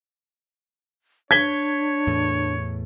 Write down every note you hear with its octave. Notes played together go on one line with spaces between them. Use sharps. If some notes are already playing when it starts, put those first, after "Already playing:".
D4 C#5 G#6 B6 G7
E2 A2 A3